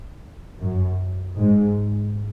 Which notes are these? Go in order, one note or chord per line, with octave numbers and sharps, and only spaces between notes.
F#2
G#2